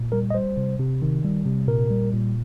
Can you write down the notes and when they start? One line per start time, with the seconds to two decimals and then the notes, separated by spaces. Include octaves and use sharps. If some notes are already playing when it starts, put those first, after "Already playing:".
Already playing: A#2
0.12 G3 A#4
0.30 D#5
0.34 G3 C5
0.57 C3
0.79 C3
1.02 D#3
1.24 G3
1.46 C3
1.68 A#2 A#4
1.90 G3
2.13 A#2